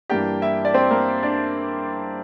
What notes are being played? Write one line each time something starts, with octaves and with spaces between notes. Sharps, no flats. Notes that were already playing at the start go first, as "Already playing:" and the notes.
G2 E3 A#3 D4 G4 G5
E4 E5
D5
C4 C5
A#3 A#4
D4 D5